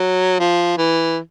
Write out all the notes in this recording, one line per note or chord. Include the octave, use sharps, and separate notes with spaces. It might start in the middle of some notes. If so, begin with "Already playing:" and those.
Already playing: F#3
F3
E3